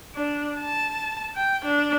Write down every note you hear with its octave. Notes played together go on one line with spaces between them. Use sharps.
D4
A5
G5
D4